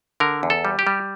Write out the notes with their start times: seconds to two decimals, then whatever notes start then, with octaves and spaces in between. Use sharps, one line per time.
0.20 D3 A#4
0.43 E2
0.50 A4
0.65 G3
0.79 G4
0.87 G3